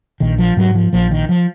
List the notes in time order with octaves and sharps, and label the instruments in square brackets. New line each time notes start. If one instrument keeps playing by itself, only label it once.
[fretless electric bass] A#1 D#3
F3
G#2 F#3
F3
A#1 F3
D#3
F3